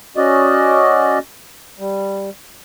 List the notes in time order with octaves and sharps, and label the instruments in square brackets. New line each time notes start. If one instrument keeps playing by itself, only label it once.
[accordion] C#4 F#4 D5 D#5
G3